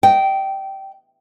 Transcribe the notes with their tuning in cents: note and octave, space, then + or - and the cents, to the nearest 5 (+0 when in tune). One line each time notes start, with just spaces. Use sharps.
D#5 +0 G5 -15